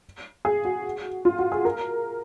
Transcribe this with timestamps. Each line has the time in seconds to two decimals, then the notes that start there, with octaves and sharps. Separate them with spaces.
0.45 G#4
0.65 F#4
1.25 F4
1.39 F#4
1.52 G#4
1.65 A#4